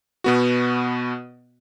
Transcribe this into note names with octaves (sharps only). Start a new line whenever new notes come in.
B2 B3 F#4